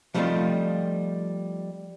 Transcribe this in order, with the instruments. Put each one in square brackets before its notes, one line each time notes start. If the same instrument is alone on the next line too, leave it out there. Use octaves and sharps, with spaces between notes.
[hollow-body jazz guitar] F3 G3 A3 C4 D#4 F4